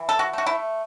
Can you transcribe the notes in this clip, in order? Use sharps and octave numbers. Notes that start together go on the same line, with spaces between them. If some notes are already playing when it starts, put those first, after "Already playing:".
Already playing: E3
A4
F#4
A3 F#4
E4